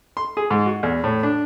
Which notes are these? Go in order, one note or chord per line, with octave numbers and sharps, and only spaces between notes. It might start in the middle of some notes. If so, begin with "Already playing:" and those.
C6
G#4
G#2
F#4
E2
A2
D4